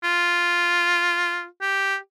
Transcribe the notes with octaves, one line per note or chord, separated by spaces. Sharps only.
F4
G4